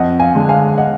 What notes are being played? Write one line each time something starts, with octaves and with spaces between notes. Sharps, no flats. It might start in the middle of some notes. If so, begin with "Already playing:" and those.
Already playing: F2 D#5 F#5
F5 G#5
D3 G#3
F5 G#5
D#5 F#5